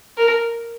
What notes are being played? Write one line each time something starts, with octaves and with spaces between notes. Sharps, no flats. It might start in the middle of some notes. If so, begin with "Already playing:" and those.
A#4